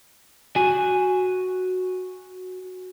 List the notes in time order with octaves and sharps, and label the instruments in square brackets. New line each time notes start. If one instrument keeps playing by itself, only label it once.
[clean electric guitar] F#4 G#5